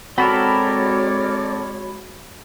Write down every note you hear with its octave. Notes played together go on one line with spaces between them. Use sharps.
G#3 C4 F#4 A4 A#4 C#5 D5 B5